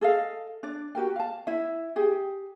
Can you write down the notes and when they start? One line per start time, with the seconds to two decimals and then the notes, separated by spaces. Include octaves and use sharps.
0.01 G#4 A4 D#5 F5
0.63 D4 D5
0.95 F#4 G4 A#4 G5
1.16 F5 A5
1.47 E4 E5
1.96 G4 G#4 G5